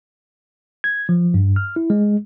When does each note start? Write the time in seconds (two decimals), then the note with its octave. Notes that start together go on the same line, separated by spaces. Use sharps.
0.84 G#6
1.09 F3
1.34 G2
1.56 F6
1.76 E4
1.90 G#3